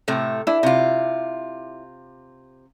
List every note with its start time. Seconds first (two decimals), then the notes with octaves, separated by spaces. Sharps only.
0.08 A2 C3 A3
0.47 D4 E4
0.63 C3 F4